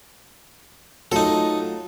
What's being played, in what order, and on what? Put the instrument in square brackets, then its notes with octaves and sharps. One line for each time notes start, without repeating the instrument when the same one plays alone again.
[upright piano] F#3 A3 F4 [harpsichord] D#4 A4